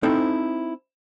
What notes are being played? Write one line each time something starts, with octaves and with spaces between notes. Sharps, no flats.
C4 D#4 E4 A4 C5